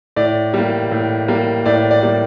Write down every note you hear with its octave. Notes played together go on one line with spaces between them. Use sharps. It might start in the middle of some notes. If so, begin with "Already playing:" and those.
A2 D5
G3 A#3
A2
G3 A#3
A2 D5
D5
G3 A#3